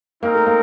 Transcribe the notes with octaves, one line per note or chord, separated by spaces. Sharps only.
A#3 C4 D#4 A#4
A3
A#3